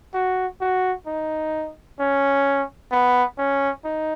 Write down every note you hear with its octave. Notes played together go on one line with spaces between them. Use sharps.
F#4
F#4
D#4
C#4
B3
C#4
D#4